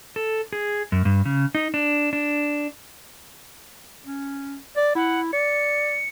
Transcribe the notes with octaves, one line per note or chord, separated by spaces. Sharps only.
A4
G#4
F#2
G2
C#3
D#4
D4
D4
C#4
D5
E4 F#5
D5 C#7